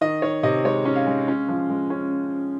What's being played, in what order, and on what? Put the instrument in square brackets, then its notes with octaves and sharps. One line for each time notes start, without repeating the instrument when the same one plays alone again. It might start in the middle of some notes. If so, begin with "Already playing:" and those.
[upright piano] D#3 D#5
D#3 C#5
C3 D#5
G#3 C#5
C#4
F5
G#3
C#4
F3
G#3
C#4